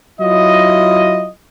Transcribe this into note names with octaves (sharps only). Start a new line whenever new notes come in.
F#3 E4 F4 D#5